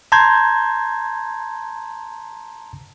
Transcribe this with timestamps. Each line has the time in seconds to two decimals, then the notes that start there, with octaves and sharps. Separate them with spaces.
0.12 A5 A#5 C6 G6 G#6